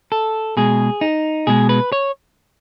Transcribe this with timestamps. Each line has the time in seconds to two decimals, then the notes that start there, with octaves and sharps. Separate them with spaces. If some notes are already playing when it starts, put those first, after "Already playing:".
0.12 A4
0.57 B2 G#3 G#4
1.01 D#4
1.47 B2 G#3 G#4
1.69 B4
1.92 C#5